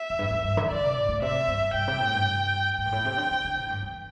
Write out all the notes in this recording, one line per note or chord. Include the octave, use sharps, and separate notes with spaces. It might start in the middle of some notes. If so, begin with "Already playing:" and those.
Already playing: E5
E2
G2
E2
G2
D3
D3 D5
C3
A2
A2
C3 E5
G2
G2 G5
C3
A2
G2
A2 G5
G2
A2
C3
D3
D3
D3
A2
G2
E2